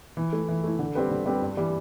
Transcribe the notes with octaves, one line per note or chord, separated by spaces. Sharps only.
E3
A3 E4
E3
A3 E4
D3
G3 C4 G4 B4
D3
G3 C4 G4 B4
G2
E3 G3